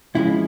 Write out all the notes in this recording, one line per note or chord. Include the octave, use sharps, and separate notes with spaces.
C#2 C#3 F3 G#3 E4